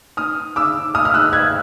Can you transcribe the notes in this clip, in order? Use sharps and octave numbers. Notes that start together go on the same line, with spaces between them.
D#6 F6
D6 E6
D#6 F6
F6
E6 F#6
F#6 G#6